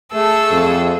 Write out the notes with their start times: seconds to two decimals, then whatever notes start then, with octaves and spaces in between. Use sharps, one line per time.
0.14 A3 G#4 A4 E6
0.50 F2